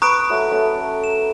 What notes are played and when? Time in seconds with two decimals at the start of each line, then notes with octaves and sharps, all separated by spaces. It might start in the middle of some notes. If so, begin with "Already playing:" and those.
0.02 B4 A#5 C#6 D#6 F#6 D7
0.30 F#3 A3
0.51 A3 C#4
1.04 E7